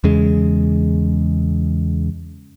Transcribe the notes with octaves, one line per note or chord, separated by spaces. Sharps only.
E2 C#3 G#3